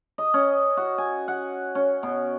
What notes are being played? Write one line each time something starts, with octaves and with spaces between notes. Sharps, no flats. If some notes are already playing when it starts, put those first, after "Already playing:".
D#5
C#4
F#4
G#5
F#5
C#4
B2